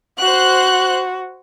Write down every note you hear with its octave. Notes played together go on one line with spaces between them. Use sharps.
F#4 C5 F#6